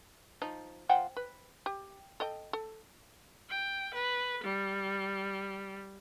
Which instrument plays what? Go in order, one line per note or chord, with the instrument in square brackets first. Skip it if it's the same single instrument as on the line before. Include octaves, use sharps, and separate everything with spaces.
[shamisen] F3 D#4
F3 F#5 G5
B4
G4
A4 D#5 G5
A4
[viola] G5
B4
G3